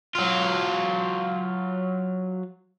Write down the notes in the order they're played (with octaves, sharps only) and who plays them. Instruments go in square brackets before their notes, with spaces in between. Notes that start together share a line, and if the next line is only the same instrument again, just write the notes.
[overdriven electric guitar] F#3 F4